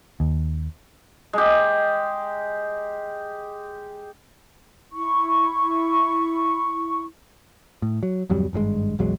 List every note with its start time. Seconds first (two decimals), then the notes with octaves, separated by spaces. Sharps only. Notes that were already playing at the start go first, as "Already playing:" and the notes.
0.20 D#2
1.33 G#3 G4
4.92 E4 C#6
7.82 A2
8.03 F#3
8.30 D1 F2 F#3 G3
8.53 G#1 G2 F3 G#3
8.99 A#1 E2 F#3 G#3